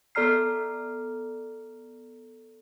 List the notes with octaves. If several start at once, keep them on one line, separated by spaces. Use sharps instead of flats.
B3 A4 D5 A#5 F6 C7